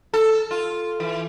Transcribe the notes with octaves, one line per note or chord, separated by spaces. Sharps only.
A4
F4
E3